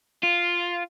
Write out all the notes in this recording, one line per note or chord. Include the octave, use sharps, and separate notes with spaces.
F4